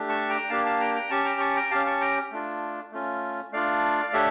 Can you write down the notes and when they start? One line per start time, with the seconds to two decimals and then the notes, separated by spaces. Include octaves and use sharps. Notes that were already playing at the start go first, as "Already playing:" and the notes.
Already playing: A3 D4 G4
0.09 A5 C#6
0.29 G5 A#5
0.49 A#3 D4 G4 F5 A5
0.66 F5 A5
0.80 G5 A#5
0.95 G5 A#5
1.10 C#4 G4 A5 C#6
1.25 G5 A#5
1.40 A5 C#6
1.56 G5 A#5
1.71 C#4 G4 F5 A5
1.86 A5 C#6
2.01 G5 A#5
2.31 A3 D4 F4
2.92 A3 C#4 F4
3.52 A3 D4 F4 D5 F5
4.13 A3 D4 G4 C#5 E5